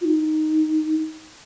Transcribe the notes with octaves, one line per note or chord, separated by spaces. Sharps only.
F4
D#4